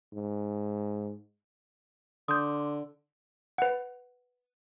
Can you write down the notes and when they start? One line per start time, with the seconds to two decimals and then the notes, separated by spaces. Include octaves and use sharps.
0.13 G#2
2.28 D3 C6 D6 D#6 G6
3.58 B4 F#5